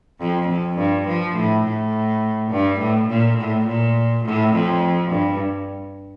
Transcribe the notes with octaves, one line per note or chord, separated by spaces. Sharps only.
F2
F2
G2
F3
A2
A2
G2
A2
A#2
A2
A#2
A2
F2
G2